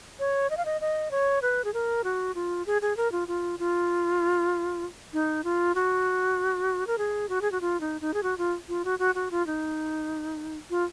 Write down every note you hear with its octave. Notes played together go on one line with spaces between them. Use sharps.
C#5
D#5
F5
D#5
D#5
C#5
B4
G#4
A#4
F#4
F4
G#4
G#4
A#4
F4
F4
F4
D#4
F4
F#4
A#4
G#4
F#4
G#4
F#4
F4
D#4
D#4
G#4
F#4
F4
F4
F#4
F#4
F#4
F4
D#4
F4